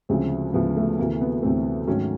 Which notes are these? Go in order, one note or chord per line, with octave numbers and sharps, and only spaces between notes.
D2 C#3 F3 G#3 C4
D2 C#3 F3 G#3 B3
A3
D2 C3 E3 A3 A#3
B3
D2 C3 E3 A3 C4
G#2 D#3 F#3 A3 C#4